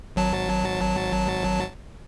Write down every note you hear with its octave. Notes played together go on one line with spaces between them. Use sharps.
G#1 F#3 A5